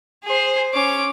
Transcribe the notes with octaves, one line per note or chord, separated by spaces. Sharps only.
G#4 C5
C#4 D6